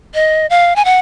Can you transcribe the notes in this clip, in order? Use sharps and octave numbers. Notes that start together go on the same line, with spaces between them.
D#5
F5
G#5
F#5